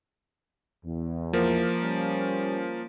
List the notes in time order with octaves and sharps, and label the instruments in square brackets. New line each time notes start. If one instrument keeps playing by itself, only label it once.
[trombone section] E2
[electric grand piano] F3 A#3 A#4
[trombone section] G3 C#4